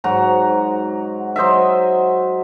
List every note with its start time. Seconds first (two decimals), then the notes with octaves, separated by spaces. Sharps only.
0.04 G#2 F#3 F#4 A#5
1.36 F#3 C5 D#5 E5